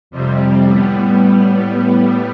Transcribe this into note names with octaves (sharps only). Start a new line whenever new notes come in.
F2 C3 G3
A2 G3 B3